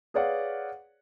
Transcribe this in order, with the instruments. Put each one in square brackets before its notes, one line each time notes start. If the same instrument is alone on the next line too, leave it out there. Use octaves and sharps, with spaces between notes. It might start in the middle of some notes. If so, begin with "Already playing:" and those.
[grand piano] G#4 B4 C#5 D5 F5 F#5